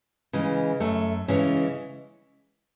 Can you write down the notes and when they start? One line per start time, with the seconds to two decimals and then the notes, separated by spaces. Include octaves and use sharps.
0.33 C#3 E3 G#3
0.80 F#2 A3
1.28 C#3 E3 G#3 C#4